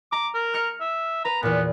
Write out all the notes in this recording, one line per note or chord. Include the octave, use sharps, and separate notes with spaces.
A#5 D6
A#4
F6 A#6 C#7
E5
B4 A#5
E2 A#2 B3